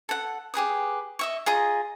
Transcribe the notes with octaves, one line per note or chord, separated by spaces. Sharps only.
A4 F#5
G4 G#4 B4 D#6
D#5 E5 C#6
F4 G#4 D#5 A#5